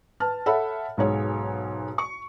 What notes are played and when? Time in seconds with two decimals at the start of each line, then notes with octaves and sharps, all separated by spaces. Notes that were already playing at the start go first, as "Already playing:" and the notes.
0.20 B4 A5 F6
0.46 A4 C#5 E5 F#5 B5
0.97 B1 G#2 C#5
1.98 C#6